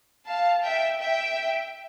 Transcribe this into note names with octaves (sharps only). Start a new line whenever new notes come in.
F5 A5
E5 G5
E5 G5